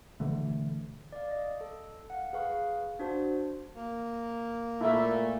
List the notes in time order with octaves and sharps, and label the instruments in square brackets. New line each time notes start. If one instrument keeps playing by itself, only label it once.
[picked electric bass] B2 D3 E3 A3
[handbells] D5 F5
D#5
A4
F5 F#5
G#4 B4 F5 C#6
D4 F#4 C5 A5
[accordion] A#3
[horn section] A#2 A3 [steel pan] E4 A#4 E5